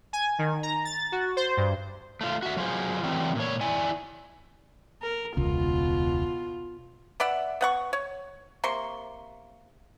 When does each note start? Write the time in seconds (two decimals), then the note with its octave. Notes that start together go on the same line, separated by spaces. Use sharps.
0.13 G#5
0.39 D#3
0.63 A#5
0.85 A6
1.12 F#4
1.37 C5
1.57 G2
2.21 A3 F4
2.43 F#4 E5
2.57 F#3 F4 G#4 C5
3.03 E3 F#3 G3 A3 C4
3.35 A#2 C#5
3.61 E4 D5 G#5
5.02 A#4
5.37 E1 C#2 B2 F4
7.20 B3 D5 E5 F#5
7.61 B3 F#5 C#6
7.93 C#5
8.64 C3 A#3 C6 C#6